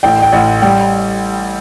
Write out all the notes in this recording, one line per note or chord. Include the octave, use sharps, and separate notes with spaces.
A1 G5
G5
A1 F#5
G3 G5